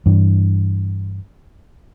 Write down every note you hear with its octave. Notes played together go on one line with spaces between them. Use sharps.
G2 E3